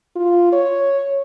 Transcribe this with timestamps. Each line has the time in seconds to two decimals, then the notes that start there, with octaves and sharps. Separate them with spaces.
0.16 F4
0.52 C#5